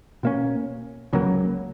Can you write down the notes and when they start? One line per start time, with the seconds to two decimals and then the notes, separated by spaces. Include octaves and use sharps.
0.23 B2 A#3 C#4
1.13 C#2 C#3 F#3 A#3